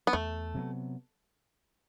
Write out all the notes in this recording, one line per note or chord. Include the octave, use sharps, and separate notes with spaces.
B3
E2 A3
C3 F#3 B3